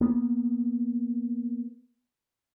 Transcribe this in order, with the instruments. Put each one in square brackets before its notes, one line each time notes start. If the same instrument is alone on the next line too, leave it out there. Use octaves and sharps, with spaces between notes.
[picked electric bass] A#3 B3